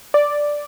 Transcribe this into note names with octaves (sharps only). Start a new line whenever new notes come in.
D5